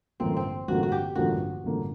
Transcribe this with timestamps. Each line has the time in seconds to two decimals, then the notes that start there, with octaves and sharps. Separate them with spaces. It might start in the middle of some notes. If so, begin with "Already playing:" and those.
0.20 A1 G2 D3 F3 A#3 C4
0.37 C4
0.68 A1 G2 D3 F3 A#3 F#4
0.83 F#4
0.92 G4
1.15 A1 G2 D3 F3 A#3 F#4
1.64 A1 G2 D3 F3 A#3